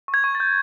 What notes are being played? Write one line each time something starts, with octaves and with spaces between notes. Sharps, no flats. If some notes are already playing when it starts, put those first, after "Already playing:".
C#6
G#6
C#6
A6
G6